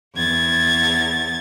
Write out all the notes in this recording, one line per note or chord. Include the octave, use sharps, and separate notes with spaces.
E2 G#6 A6